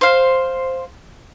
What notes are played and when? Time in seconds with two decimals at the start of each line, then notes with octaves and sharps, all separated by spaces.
0.01 C5 F5